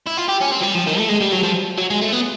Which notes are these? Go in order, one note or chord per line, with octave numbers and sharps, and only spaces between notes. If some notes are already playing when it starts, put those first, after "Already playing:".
E4
F4
G4
C#4
C4
F#3
G3
F3
D#3
A3
G#3
G3
F#3
F3
F#3
G#3
A3
B3